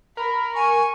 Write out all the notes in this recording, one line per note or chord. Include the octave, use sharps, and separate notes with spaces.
A#4 B5
G#5 C#6